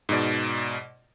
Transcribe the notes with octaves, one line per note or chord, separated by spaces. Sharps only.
G#2 B2 D5